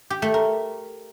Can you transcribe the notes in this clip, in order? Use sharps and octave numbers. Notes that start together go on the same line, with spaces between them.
G4
A3
A#4